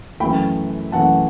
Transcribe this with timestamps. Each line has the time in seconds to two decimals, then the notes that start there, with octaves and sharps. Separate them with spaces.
0.20 F#2 E3 A3 G5 B5
0.92 F#2 E3 A3 F#5 A5